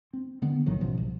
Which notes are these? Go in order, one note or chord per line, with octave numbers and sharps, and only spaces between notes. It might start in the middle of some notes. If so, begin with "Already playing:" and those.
C4
D3 D#3 B3
B1 A2 D#3 F#3
A1 B2 F3
C2